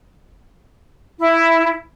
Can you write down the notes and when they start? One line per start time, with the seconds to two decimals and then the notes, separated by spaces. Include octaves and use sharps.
1.19 E4